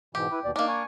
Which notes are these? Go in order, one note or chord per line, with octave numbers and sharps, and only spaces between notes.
G#2 B2 E3 G4
E4 B4
D#2 B2 D5
A#3 D4 D#4 D6
G#5 C#6